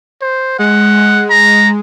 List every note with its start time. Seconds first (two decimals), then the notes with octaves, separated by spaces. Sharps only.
0.21 C5
0.59 G#3 F#5
1.30 A#5